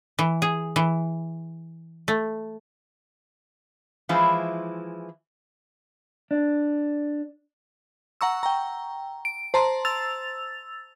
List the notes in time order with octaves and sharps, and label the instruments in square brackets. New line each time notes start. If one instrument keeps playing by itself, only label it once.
[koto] E3
G#4
E3
A3
[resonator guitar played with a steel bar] E3 F3 G#3 E4
[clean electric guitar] D4
[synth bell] F#5 A#5 C#6 E6
G5 A#5
D7
C5 A5 A#5 C6
E6 A6 F7